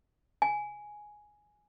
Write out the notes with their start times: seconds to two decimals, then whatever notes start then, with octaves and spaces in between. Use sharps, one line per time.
0.42 G#5